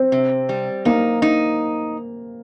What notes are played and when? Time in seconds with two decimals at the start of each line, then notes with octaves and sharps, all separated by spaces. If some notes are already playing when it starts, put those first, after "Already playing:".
Already playing: C4
0.12 C3
0.49 G3
0.85 A#3 D#4
1.22 D#4